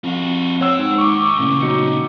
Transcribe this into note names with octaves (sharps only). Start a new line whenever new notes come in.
F2 F4 F#4
C4 C5 C#5 F#5 E6
G#2
D#2 D#3 C#6 D6
A1 A#2 C#3
F#3 D#4 C#7